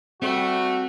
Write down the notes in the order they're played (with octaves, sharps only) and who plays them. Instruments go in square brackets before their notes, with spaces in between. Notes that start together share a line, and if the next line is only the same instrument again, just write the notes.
[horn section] G3 A3 [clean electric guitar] C4 [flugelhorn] F#4